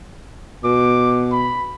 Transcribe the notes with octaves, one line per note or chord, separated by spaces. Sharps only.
B2 D6
B5